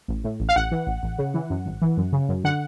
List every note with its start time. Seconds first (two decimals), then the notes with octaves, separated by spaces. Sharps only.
0.08 A1
0.24 A2
0.40 A1
0.49 F5
0.56 A1 F#5
0.72 E3
0.87 A1
1.03 A1
1.18 C#3
1.34 E3
1.50 F#2
1.66 G#1
1.82 E3
1.97 F#2
2.13 C#3
2.29 F#2
2.44 D3 F#5